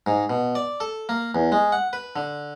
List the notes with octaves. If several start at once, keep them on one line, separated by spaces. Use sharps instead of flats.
G#2
B2
D5
A4
A#3
E2
G#3
F#5
B4
D3